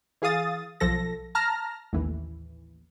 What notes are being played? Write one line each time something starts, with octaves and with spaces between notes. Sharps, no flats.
E3 G#4 F5 D#6 A6
B1 F3 A4 A#6
A5 A#5 F6 A#6
A1 D#2 E3